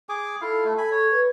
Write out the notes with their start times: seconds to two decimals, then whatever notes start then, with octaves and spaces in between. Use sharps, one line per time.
0.09 G#4 G#5 D6
0.41 E4 F4 A4 F5
0.65 A3
0.78 G#5 B5
0.92 C#5
1.12 B4